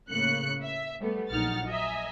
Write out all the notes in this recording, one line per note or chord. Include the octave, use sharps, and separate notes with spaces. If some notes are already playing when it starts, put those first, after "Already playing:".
A2 C#3 A#3 F#6 C#7
E5
G3 A3 B3
A#1 F#3 D#4 F#5 F6 A6
D#5 E5 G#5 A#5